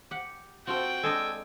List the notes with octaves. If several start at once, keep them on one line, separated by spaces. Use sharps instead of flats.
G4 F#5
C4 F4 F#4 A4 G5
G#3 D4 A4 D#5 G#5